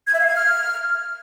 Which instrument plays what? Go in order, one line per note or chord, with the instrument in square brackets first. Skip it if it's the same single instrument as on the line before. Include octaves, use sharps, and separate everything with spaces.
[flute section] G#6
E5
F5
G#6
F6